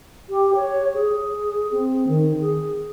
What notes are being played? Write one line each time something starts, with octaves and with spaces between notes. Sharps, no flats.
G4
C#5
G#4
C4
D#3
G#4